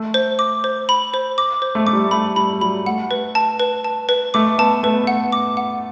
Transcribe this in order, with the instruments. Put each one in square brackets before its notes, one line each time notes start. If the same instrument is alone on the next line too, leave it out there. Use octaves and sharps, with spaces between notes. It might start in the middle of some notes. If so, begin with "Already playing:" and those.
Already playing: [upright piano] A3
[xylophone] C5
D6
C5
B5
C5
D6
C5
[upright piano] A3
[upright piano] A3 [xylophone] D6
[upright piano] G3
[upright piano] A3 [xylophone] B5
[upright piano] G3 [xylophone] B5
[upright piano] G3
[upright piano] F#3 [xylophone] B5
[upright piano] A3 [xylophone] F#5
[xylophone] B4
A5
B4
A5
B4
[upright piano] A3 [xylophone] D6
[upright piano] B3 [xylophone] A5
[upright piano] A3 [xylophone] B4
[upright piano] B3
[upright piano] A3 [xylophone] F#5
[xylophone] D6
F#5